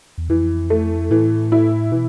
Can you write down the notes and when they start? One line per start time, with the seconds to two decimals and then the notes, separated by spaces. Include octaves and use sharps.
0.18 E2
0.29 F2 E3
0.70 A3
1.11 A2 E3
1.52 E4
1.92 B2 E3